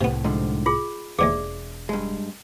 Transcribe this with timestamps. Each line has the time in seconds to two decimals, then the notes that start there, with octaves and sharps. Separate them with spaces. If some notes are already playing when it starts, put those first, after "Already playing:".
0.01 C2 A2 C3 B3
0.24 G#2 D3 F3
0.66 F4 G#4 B5
1.19 E1 D#2 G#2 E3 G#4 D5 E5
1.89 G2 G#3